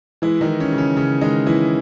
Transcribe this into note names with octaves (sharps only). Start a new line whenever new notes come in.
E3 G#3 E4
D#3 D#4
E3
C#4
C#3
C#4
C#3 C#4
D#3 G#3 D#4
E3 E4